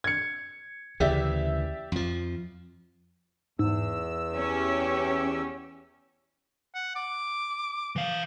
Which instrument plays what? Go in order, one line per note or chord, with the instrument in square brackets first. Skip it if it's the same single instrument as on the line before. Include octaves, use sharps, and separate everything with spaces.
[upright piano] G#6 C#7
[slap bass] D2 C#3 E3 [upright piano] G4 D5 E5
[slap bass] F2 F3
[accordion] E2 E6 [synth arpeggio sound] G#2
[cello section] C#4 G4
[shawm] F#5
D6
[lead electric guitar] E3 F5